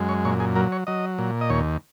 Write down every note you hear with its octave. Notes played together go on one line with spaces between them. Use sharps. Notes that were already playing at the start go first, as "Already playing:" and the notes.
Already playing: F#2 G#3
C#5
A#2 C#5
G#4
F#3 A#4
C#5
F#3 D#5
A#2
D#5
D#2 C#5